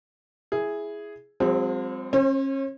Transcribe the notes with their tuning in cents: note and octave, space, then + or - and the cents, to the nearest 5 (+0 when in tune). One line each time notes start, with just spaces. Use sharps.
E4 +0 G#4 +0
F3 +40 G#3 -40 C4 +0
C#4 -35 C5 +35